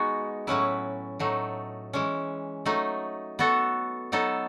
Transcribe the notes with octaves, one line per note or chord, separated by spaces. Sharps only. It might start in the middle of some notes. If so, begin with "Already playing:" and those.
Already playing: G#3 B3 D#4 F#4
A2 F#3 C#4 E4 B4
A2 F#3 A3 D#4
E3 G#3 C#4
F#3 A3 D#4
B3 F#4 A4
F#3 B3 D#4 A4